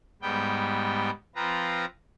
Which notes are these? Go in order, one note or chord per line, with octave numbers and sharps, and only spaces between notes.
G#2 G3 B3 G5
F3 C4 F4 B4 A#5